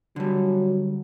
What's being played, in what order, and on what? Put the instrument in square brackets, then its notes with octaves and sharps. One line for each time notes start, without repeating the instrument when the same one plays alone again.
[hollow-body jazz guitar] D3 G3 [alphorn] F#3